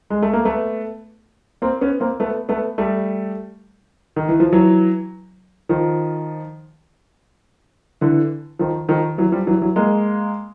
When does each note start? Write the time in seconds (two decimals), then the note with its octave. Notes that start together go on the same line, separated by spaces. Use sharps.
0.10 G#3
0.22 A3
0.33 A#3
0.45 A3 B3
1.62 A#3 C4
1.81 B3 C#4
2.00 A#3 C4
2.20 A3 B3
2.49 A3 B3
2.78 G3 A3
4.16 D#3
4.29 E3
4.40 F3
4.52 E3 F#3
5.69 D#3 F3
8.01 D3 E3
8.59 D#3 F3
8.89 D#3 F3
9.18 E3 F#3
9.32 F3 G3
9.47 E3 F#3
9.61 E3 F#3
9.76 G#3 A#3